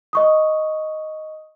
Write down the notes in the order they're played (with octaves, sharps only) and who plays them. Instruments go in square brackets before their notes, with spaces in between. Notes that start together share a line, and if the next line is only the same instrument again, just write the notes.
[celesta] D#5 C#6 D#6